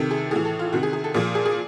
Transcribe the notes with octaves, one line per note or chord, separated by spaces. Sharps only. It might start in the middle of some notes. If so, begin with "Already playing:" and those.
Already playing: C3 D#3 A4
G#4
A2 E3 G#4
A4
F4
C3 D#3 F#4
G#4
G#4
A4
A#2 F3 G#4
G#4
G#4